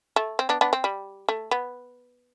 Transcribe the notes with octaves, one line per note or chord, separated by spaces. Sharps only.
A3
C4
B3 D4
B3 D4
C4
G3
A3
B3